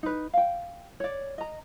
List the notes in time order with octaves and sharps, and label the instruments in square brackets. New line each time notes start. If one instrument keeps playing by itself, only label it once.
[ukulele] D#4 B4
F5 G5
C#5 D5
D#5 A#5